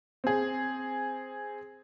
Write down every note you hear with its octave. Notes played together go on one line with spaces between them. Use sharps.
C4 G#4